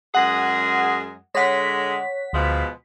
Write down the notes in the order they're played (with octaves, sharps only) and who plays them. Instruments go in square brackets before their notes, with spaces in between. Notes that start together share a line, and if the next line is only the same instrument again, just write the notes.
[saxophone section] F#2 G#3 G#4 [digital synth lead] F#5
[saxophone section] D3 G#3 [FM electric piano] C#5 F#5 [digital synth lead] B6
[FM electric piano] D2 [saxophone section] B2 F3 G#3